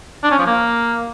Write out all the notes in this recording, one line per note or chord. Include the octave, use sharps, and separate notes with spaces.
D4
C#4
F3
A#3